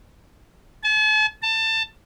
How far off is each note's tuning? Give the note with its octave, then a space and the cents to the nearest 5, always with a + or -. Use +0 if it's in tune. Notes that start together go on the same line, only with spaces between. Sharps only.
A5 -45
A5 +20